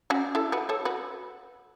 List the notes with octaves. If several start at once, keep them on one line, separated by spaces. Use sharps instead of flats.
C#4 F#4
E4 A4
F#4 B4
A4 C#5
F#4 B4